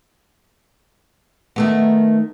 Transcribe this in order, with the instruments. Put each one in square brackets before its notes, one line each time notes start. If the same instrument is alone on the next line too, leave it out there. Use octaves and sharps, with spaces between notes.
[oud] D#3 A3 B3